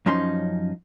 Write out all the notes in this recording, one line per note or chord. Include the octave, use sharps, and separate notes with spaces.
F#2 F3 C#4 D#4 C6